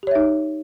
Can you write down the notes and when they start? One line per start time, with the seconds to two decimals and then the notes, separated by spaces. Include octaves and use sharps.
0.03 G4
0.07 C#5
0.11 E5
0.15 D#4